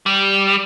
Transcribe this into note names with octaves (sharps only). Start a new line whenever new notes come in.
G3